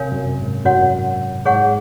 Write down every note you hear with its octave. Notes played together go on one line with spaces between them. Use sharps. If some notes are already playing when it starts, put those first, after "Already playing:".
Already playing: C3 A#4 C#5 F5 G#5
F#2
G#2
F#2 F#4 C#5 F#5
G#2 G#4 C#5 F#5 C#6